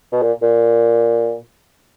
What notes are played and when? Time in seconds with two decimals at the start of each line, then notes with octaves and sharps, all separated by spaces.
0.12 B2
0.22 A#2
0.42 A#2